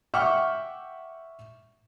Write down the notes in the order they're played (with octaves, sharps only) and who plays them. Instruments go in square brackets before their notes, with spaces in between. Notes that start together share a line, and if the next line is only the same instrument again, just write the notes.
[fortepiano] E5 F#5 G5 C#6 D6 F6